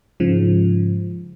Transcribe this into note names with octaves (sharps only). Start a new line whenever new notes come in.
G#2 C#3 F3